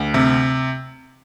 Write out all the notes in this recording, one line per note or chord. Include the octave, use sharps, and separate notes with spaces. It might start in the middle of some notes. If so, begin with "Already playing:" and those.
Already playing: D2
C3